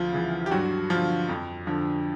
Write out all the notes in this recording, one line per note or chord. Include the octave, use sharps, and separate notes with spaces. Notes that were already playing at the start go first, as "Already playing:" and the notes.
Already playing: D2 F3 F4
C#3 E3
G4
G2 F#3 F#4
D3 F3 F4
F2
D3 F3